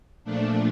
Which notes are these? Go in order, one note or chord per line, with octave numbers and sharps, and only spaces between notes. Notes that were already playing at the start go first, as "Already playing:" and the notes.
A#2 F3 A3 D4